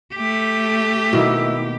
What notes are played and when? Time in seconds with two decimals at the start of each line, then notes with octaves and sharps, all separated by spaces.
0.14 A3 G4
1.13 B2 D#3 A#3 E4